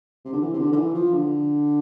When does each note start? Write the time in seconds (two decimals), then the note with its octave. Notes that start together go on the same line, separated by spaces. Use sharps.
0.25 C3
0.33 D3
0.41 E3
0.54 C3
0.59 D3
0.72 D3
0.76 E3
0.94 F3
1.13 D3